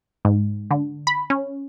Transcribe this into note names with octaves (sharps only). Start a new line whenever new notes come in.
G#2
D3
B5
C#4